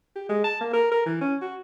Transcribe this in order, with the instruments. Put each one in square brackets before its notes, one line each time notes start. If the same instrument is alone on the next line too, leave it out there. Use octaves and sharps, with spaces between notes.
[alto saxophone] G4
G#3
A5
A#3
A#4
A#4
E3
C#4
F#4